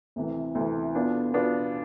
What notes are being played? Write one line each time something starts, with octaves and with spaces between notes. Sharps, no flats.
D2 C3 E3
D2 C3 E3
B2 B3 D4 F4
B2 B3 D4 F4